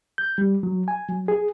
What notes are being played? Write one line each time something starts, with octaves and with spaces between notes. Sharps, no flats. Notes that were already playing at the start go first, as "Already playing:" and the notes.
G6
G3
F#3
G#5
F#3
G#4